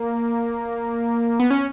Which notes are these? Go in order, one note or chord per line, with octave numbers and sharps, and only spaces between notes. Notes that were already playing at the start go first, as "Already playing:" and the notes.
Already playing: A#3
B3
C#4